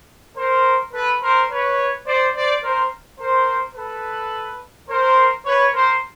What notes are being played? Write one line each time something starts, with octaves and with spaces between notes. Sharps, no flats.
A#4 C5
A4 B4
A#4 C5
B4 C#5
C5 D5
C5 D5
A#4 C5
A#4 C5
A4 B4
A#4 C5
B4 C#5
A#4 C5